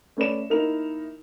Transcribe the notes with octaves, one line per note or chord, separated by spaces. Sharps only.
A3 C#4 B4 D5 E7
A#3 D#4 E4 A#4 F7